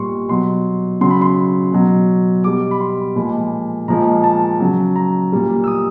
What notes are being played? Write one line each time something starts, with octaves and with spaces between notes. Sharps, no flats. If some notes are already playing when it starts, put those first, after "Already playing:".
Already playing: A#2 G3 C6 C#6
B2 F#3 C6
C#3 F#3 C6
B5
C6
B2 F#3
B2 G3 D6
B5
C6
A#2 F3 G#3 B5
A#2 F3 G#3 A#5
A5
C#3 F#3
A#5
A#2 G3
E6
D#6